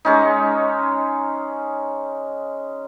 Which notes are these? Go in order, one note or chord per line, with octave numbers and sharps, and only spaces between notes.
G#3 C#4 D#4